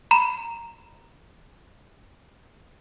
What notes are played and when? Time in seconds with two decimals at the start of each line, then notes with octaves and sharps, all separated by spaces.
0.11 A#5 B5